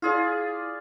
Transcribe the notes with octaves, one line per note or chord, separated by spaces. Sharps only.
E4 F4 G#4 D5